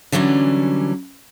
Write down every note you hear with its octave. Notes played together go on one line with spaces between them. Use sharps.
D3 E3 F#3 G3 C#4